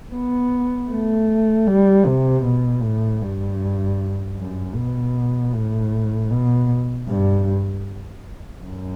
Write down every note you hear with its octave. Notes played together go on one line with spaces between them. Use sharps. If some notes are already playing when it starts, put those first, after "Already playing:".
B3
A3
G3
C3
B2
A2
G2
F#2
B2
A2
B2
G2
F#2